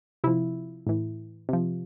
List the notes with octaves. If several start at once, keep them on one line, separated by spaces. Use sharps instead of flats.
C3 F3 E4
A2 E3
C3 F3